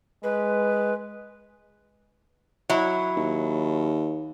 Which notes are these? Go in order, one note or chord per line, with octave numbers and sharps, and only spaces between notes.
G#3 B4
F#3 E4
D#2